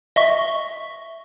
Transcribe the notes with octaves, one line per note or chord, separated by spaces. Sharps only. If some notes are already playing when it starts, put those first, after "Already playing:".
D#5 E5 C#6